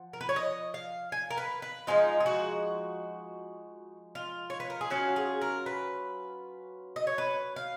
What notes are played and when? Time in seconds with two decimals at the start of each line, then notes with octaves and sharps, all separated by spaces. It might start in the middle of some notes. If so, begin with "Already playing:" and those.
Already playing: F3 F#5
0.13 A#4
0.21 B4
0.29 C#5
0.36 D#5
0.74 F5
1.12 G#5
1.30 A#4
1.38 B4
1.62 B4
1.87 F3 G#3 D#4 F4
2.20 G#4
2.26 F#4
4.15 F4
4.50 C#5
4.60 B4
4.70 A#4
4.81 G#4
4.90 F#3 C#4 F4 F#4
5.16 G#4
5.41 A#4
5.66 B4
6.96 D#5
7.07 C#5
7.18 B4
7.56 F5